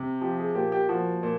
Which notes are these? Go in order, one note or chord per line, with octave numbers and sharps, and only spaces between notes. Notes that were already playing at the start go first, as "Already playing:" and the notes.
Already playing: C3
F3 G4
G#4
A#2 G4
G4
F3 F#4
A#2